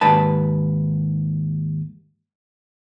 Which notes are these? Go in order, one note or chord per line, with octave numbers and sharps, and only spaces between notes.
D#2 G#2 B4 A5